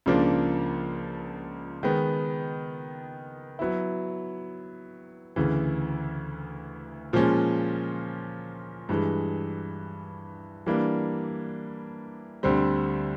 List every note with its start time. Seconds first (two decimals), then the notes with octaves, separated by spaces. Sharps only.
0.06 C#2 C#3 F3 A#3 D4
1.83 D#3 G#3 B3
3.59 F#3 B3 E4
5.36 D2 C#3 E3
7.13 A#2 F3 G#3 C#4
8.89 G2 E3 G#3
10.66 E3 G3 A#3 D4
12.43 D2 D3 G3 C4